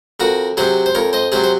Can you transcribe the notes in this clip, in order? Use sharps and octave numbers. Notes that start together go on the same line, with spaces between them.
F2 F#4 A#4
C3 F#3 G#4 C5
C5
F2 A#4 C#5
C5 D#5
C3 F#3 G#4 C5
C5